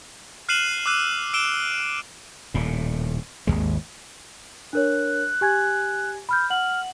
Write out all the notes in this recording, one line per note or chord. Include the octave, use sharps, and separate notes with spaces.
F6 F#6 C7 D#7 E7 F#7
D6 E6 F#6 D#7
E6 D7 E7 G7
D#1 A2
G#1 D#2 G#3
D4 A#4 C#5 F#6
G4 G#5 G#6
B5 F6 G6
F#5 F6 F#7